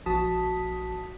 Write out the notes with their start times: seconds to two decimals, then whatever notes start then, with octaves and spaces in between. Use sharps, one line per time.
0.06 A#1 F3 F#4 A5 D#6 B6